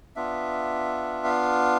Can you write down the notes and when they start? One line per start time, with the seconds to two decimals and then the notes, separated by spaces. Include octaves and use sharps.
0.16 B3 D4 F4 E5
1.24 F5